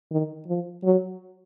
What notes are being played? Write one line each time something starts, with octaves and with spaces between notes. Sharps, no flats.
D#3
F3
F#3